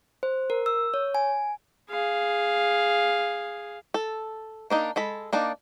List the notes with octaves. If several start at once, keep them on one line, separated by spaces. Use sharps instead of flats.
C5
A#4
E6
C#5
G#5
G#4 F5
A4
A#3 D4 D#4
G#3 A4 B5
A#3 D4 D#4 D5